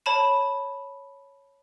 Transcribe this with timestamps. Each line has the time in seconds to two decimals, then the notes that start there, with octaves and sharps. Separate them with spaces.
0.06 C#5 A5 B5 E7